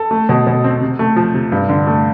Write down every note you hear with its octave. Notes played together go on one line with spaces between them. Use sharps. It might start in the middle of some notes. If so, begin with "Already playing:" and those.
Already playing: A4
A3
B2
B2
C4
C3
A3
F3
C3
G2
D3
A3